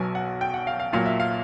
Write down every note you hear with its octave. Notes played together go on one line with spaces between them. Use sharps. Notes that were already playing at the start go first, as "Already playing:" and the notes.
Already playing: B1 B2 F#3 G#5
F#5
G5
F#5
F5
F5
B1 A#2 F#3 F5
E5
F5